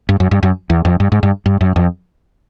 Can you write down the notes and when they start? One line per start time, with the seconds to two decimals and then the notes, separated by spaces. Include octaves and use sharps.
0.09 G2
0.20 F#2
0.31 G2
0.43 F#2
0.70 E2
0.85 F2
1.00 G2
1.12 G#2
1.23 G2
1.46 G2
1.61 F#2
1.76 F2